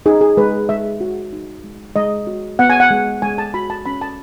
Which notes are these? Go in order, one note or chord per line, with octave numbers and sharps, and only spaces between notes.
D#4 G#4
G#4
G#3 B4
G#3 E5
F#4
D#4
G#3
G#3 D#5
F#4
B3 F#5
G#5
F#5
G#3
G#3 G#5
A5
F#4 B5
A5
C#4 B5
A5